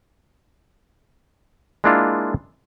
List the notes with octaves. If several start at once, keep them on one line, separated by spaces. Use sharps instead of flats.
G#3 A#3 D4 E4 F4